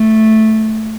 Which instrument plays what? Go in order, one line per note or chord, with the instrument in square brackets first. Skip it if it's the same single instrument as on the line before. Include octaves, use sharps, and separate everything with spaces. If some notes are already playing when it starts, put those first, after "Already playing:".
Already playing: [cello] A3